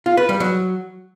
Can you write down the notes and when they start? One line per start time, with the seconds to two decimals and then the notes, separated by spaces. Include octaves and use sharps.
0.06 F4
0.17 B4
0.29 G3
0.40 F#3